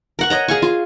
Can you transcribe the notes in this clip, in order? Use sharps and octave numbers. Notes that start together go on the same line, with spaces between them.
A#4 F#5 C#6
C#5 D#5 A#5
G#4 F5 G#5 C#6
F4